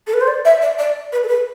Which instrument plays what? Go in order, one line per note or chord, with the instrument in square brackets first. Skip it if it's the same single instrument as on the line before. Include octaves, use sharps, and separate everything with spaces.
[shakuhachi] A4
B4
C5
D5
E5
D5
D5
B4
A4
B4